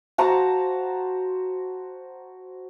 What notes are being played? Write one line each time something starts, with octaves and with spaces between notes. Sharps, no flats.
F#4 C5 A5 A#5